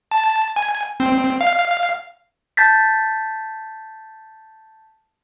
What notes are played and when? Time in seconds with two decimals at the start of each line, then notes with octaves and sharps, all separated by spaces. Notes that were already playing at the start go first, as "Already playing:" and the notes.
0.11 A5
0.56 G#5
1.00 C4
1.41 F5
2.57 A5 G6 A6 B6